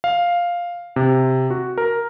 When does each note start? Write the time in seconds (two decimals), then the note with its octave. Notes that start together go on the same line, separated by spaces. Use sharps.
0.04 F5
0.96 C3
1.50 F#4
1.78 A#4